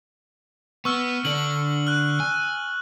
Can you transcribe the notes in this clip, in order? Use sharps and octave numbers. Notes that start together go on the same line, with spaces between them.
B3 C#6 E6 F6
D3 D4 F#7
F6 F#6
G#5